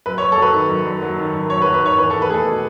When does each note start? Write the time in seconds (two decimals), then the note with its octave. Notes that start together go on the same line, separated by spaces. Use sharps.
0.06 F#2 B4
0.18 C#5
0.21 F#2
0.32 A4
0.38 F#3 B4
0.54 D#3
0.69 F#2
0.86 F#2
1.02 F#3
1.18 D#3
1.33 F#2
1.49 F#2 C#5
1.62 B4
1.65 F#3
1.74 B4
1.81 D#3 C#5
1.98 E2 B4
2.10 A4
2.14 E2
2.22 B4
2.30 A3 G#4 A4
2.46 B2